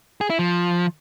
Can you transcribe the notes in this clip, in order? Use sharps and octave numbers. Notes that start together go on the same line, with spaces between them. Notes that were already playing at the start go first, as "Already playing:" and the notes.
G#4
E4
F3